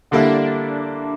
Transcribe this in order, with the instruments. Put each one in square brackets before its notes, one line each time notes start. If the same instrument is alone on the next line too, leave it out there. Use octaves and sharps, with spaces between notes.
[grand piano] D3 G3 A#3 E4 [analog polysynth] D4